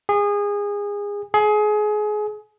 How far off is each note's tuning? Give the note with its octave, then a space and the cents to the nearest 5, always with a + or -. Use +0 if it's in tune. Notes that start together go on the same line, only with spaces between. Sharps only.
G#4 -25
G#4 +25